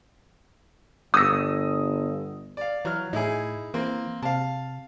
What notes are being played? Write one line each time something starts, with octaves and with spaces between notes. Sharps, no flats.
G1 D#6 E6 A#6
D5 F5
E3 F#3 F6
A2 D#4 E4 G#4
E3 A#3 C4
C3 F5 A5